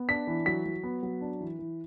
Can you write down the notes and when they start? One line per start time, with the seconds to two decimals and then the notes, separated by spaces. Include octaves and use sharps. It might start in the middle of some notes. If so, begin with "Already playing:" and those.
Already playing: B3
0.09 D4 B6
0.27 E3
0.46 F#3 B6
0.65 F#3
0.83 B3
1.03 F#3
1.21 D4
1.40 E3
1.59 E3